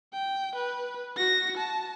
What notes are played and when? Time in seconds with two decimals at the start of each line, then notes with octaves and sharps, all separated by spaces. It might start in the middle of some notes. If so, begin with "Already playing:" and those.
0.13 G5
0.56 B4
1.17 F#4 A#6
1.57 A5